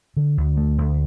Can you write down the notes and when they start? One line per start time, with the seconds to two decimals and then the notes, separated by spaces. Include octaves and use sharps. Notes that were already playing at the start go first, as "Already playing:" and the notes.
0.17 D3
0.37 D2
0.57 A3
0.78 D2